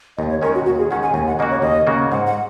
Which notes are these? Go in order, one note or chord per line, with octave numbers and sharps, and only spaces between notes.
D#2 D#5
C#5
D#3 G#3 C#4 A#4
F#4
D#2 F#4
G#4
D#3 G#3 C#4 F#5
G#5
D#2 G#5
F#5
C#3 A#3 F#4 D#5
C#5
D#2 D#5
C#3 A#3 F#4
G#2 F#5
F#5